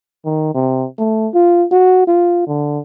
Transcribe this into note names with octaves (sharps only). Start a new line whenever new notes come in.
D#3
C3
A3
F4
F#4
F4
D3